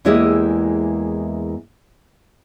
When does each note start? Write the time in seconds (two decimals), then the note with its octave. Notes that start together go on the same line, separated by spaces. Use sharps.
0.05 E2 G#3 A#3 E4 G4 D#5